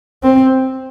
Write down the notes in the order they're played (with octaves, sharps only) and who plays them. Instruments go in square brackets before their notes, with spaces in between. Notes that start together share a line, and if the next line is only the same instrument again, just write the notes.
[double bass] C4